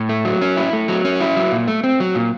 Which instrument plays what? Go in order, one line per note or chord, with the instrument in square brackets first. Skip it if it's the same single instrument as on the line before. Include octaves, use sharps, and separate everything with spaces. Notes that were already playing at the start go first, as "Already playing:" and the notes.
Already playing: [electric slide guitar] A2
A3
F#3
C#4
E4
A3
F#3
C#4
E4
F#3
A#2
A3
C4
F#3
A#2